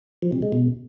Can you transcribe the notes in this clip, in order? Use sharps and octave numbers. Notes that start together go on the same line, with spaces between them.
F3
C3
G#3
B2